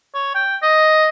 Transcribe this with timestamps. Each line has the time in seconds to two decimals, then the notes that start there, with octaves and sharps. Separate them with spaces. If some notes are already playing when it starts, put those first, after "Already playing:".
0.15 C#5
0.35 G5
0.63 D#5